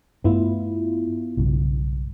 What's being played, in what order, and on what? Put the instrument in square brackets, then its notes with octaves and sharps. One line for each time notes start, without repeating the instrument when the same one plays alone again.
[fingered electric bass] G2 A3 [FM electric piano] B3 E4 F4
[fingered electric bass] B1 G2 C#3